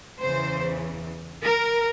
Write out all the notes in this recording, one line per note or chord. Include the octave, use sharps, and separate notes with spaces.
E2 C#3 E3 C5
A#4